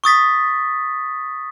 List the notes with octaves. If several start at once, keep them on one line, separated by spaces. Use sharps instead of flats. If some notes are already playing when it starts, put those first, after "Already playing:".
C#6 D#6 A6 B6